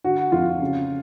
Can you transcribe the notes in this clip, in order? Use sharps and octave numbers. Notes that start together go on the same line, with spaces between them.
D3 F#4
F2 F4
C#3